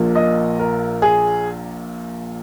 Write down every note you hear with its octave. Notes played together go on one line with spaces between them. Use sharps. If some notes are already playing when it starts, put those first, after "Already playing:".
Already playing: A#1 A#2 A#3
D#5
A#4
G#4